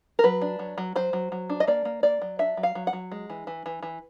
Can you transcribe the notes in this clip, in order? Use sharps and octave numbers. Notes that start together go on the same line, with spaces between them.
A#4
F#3 B4
D4
F#3
F#3
F#3 C5
F#3
F#3
D4
D#5
A#3 D5
A#3
A#3 D5
F#3
D4 E5
F#3
F5
F#3
F#5
F#3
G#3
E3
E3
E3
E3